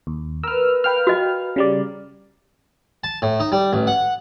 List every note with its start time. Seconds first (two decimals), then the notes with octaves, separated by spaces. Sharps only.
0.07 D#2
0.43 A#4 B4 E6 F6
0.84 B4 F5 G5 F6
1.07 F#4 D#5
1.56 C#3 G3 D5
3.04 A5
3.22 A2
3.40 D#4
3.52 G3
3.73 A1
3.87 F#5